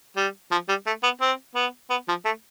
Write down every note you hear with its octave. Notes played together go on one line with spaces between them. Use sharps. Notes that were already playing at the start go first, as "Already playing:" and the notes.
G3
F3
G3
A3
B3
C4
B3
B3
F3
A3